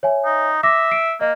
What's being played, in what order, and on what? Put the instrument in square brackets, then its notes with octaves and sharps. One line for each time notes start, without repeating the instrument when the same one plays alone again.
[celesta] C#5 E5 G#5
[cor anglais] D#4
[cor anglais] E5 [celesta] D6 D#6 A#6
[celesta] C7 D7
[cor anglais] A#3 [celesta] D#5